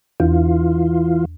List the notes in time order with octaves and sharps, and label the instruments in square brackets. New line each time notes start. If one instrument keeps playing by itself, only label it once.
[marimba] E2 [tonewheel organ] E3 F4